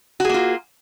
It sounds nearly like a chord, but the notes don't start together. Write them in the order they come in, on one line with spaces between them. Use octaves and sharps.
F#4 G#4 A#3 F4